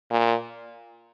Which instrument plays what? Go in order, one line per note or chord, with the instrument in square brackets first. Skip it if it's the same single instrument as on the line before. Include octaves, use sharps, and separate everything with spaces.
[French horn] A#2